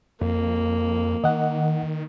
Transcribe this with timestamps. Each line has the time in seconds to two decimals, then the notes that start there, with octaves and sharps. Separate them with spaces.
0.21 F2 A#3
1.24 D#3 D#5 F#5